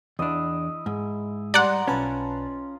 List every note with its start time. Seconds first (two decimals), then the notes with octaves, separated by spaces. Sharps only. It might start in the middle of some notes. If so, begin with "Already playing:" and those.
0.19 E2 D4 E4 D#5
0.86 G#2
1.54 G3 D5 F#5 A#5 C6
1.88 B1 C#4 F4 B4 A5